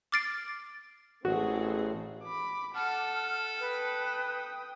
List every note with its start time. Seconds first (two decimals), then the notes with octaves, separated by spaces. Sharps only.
0.12 D6 F6 A6 C7 D7
1.25 A1 C4 F#4 G#4 A4
2.23 B5 D6
2.75 A4 F#5 A5 F6
3.60 B4 G5 D#6